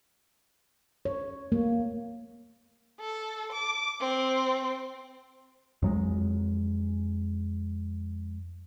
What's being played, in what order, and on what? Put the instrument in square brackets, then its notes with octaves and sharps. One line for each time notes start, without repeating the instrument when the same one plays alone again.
[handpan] C#5
A#3
[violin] A4
D6
C4
[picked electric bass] F2 F#3 G#3